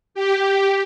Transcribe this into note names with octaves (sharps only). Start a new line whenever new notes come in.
G4